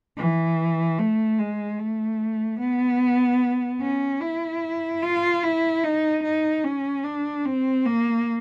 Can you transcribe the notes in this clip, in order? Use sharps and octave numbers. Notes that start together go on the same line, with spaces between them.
E3
A3
G#3
A3
B3
C#4
E4
F4
E4
D#4
D#4
C#4
D4
C4
A#3